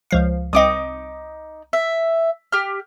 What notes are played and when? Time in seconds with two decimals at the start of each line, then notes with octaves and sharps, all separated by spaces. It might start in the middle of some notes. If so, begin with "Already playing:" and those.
0.11 C#2 F3 F5
0.53 C2 C4 D#4 D#5 D6 D#6
1.73 E5
2.52 G4 F6